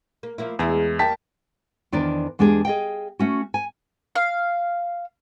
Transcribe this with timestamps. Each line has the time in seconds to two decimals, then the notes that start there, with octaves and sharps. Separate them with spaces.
0.23 A#3
0.38 F3 A#3 E4
0.59 E2 G#3 E4 G#4
0.99 G3 A#3 E4 G5 A5 B6
1.92 E2 D#3 D4 A#4 C5 D5
2.39 E2 G#3 D4 G4 G#4
2.65 G#4 D#5 F5 G5
3.19 A3 C#4 F#4
3.54 G#5
4.16 F5